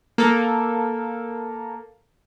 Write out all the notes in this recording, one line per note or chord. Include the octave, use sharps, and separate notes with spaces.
A#3 A4